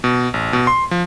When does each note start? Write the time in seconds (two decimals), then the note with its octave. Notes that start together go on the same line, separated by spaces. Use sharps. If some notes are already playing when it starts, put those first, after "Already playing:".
0.04 B2
0.34 A1
0.53 B2
0.67 C6
0.91 F3